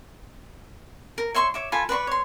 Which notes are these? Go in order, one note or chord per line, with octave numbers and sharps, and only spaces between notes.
A#4
C#5 E5 C6 C#6
C#5 E5 D6
F4 A4 G#5 B5
B4 D5 C6 C#6
C#5 C6